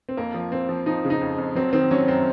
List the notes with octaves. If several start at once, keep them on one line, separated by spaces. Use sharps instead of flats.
C4
F2 A#3
F3
F3 C4
F3
F3 D#4
C#3
D#4
F2
F2
F#3 C4
D#3 C4
F#3 C#4
F#2 C4